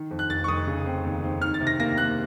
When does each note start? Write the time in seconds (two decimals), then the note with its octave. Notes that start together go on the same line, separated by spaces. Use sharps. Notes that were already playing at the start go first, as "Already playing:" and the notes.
Already playing: D#3
0.11 F2
0.19 F#6
0.30 F1 A6
0.44 C#6
0.48 F1 D#6
0.67 C#3
0.86 C4
1.05 D#2
1.24 C4
1.42 D#3 F6
1.54 A6
1.60 C3
1.67 A#6
1.79 A#3 A#6
1.98 A#3 F#6